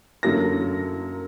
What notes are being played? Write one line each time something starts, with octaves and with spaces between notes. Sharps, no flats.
F#2 D3 F#3 A#3 A#6